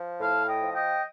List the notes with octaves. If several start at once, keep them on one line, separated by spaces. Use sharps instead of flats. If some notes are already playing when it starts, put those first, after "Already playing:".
Already playing: F3
A2 F5 A5
D#5 G5
F3
D#5 G5